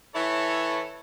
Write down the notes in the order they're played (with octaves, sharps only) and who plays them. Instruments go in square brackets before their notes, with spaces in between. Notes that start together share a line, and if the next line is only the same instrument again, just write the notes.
[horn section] E3 E4 A4 C#5